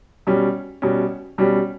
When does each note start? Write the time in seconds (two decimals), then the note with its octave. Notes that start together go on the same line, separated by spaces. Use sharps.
0.27 B2 G3 C#4
0.82 B2 G3 C#4
1.38 B2 G3 C#4